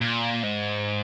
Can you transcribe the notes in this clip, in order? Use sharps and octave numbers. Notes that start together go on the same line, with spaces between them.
A#2
G#2